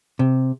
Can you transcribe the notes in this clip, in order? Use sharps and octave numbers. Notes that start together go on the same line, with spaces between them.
C3